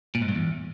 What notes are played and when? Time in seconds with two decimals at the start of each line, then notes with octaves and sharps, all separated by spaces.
0.15 A#2
0.22 G#2
0.28 G2
0.35 E2